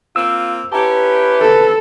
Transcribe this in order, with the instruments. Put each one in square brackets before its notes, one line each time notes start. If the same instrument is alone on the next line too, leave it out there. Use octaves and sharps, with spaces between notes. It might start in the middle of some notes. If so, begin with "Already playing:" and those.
[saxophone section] A#3 C4 F4 [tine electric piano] E6
[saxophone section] C#4 E4 G4 [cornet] B4 [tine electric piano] A5 A#5
[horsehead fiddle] A4